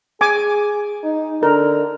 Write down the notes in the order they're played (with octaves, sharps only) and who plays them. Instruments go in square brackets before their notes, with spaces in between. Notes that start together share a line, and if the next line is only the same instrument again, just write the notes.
[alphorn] G#4 [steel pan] G#5 D6
[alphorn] D#4
[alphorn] D3 [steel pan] A#4